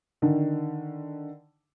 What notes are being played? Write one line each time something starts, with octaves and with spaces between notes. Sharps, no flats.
D3 D#3